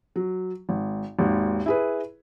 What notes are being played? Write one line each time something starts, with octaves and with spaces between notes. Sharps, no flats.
F#3
G#1
G#1 D#2
E4 G#4 B4